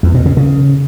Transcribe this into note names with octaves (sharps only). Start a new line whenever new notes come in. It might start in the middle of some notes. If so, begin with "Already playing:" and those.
E2
B2
C#3
C#3